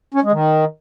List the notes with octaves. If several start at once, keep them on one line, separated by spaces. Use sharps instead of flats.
C#4
G#3
D#3